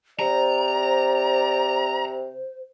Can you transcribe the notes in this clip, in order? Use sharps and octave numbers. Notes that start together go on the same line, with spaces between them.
C3 C5 D5 A#5